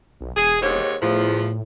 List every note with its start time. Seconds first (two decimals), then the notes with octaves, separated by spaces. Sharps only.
0.20 B1
0.36 E1 G#4
0.62 D#2 G#2 C#5
1.02 E2 A2 F3